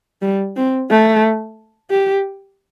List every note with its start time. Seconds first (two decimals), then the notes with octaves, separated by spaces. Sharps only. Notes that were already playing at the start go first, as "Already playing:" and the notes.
0.22 G3
0.56 C4
0.90 A3
1.91 G4